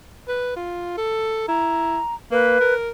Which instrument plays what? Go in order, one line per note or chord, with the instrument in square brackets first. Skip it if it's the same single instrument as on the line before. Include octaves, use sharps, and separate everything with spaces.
[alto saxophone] B4
F4
A4
[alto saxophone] E4 [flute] A#5
[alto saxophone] A#3 [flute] B4
[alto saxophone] A#4